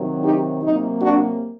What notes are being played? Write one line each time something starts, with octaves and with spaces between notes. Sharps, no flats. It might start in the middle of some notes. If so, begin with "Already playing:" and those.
Already playing: C3 D#3 F#3
D#4 G4
C3 F#3 A#3 D#4
D4 F#4